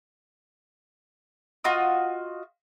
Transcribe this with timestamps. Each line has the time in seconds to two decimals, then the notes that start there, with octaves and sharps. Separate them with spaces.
1.64 F4 F#4 D#5